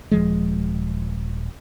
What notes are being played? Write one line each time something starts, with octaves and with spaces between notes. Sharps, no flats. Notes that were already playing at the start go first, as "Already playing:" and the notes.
D#1 F3 G#3